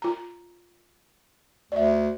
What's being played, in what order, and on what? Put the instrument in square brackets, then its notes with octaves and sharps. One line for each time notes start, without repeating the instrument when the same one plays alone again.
[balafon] F4 A#5
[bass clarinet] D2 [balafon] D5 E5